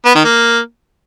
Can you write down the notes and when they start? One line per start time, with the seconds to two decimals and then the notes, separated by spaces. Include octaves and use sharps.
0.05 B3
0.15 D#3
0.25 A#3